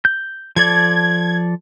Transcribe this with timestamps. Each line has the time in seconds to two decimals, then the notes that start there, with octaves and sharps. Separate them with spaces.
0.05 G6
0.56 F3 A4 D5 G#6